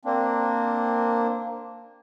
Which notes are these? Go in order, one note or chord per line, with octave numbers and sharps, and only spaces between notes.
A#3 C4 D4